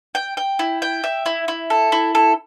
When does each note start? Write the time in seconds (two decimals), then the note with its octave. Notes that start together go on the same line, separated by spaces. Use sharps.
0.15 G5
0.37 G5
0.59 E4
0.82 G5
1.04 E5
1.26 E4
1.48 E4
1.70 A4
1.92 E4
2.15 A4